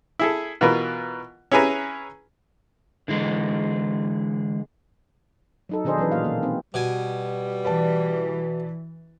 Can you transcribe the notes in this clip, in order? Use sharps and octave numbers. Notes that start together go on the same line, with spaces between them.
E4 G#4 A4
B2 E3 F4 A#4 B4
C#4 E4 G#4 B4 G#5 A#5
D3 E3 G#3
F#3 D#4 A4
B2 D#3 D4 G#4 C5 D#5
E3 F#3 C#4 B4
A#2 A#3 F5
B2 A#3
C4 D#4
B2 G3 G#5
E3 B4 D5 A5